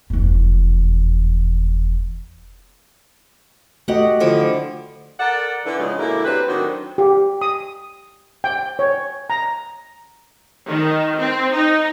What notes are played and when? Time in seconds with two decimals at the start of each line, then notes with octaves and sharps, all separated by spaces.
0.10 F1 E2
3.88 A3 F#4 G4 D#5 F#5
4.20 D3 F3 E4
5.18 A4 A#4 D5 F#5
5.65 D3 E3
5.78 C#3 F3 G#3
5.99 B2 D3 G#3 A#3 E4
6.25 F#3 C4 G4 B4
6.47 A2 D#3 F#3 C4 D4 F#4
6.98 G4
7.41 D#6
8.44 G5
8.79 C#5
9.30 A#5
10.67 D#3
11.20 C4
11.53 D#4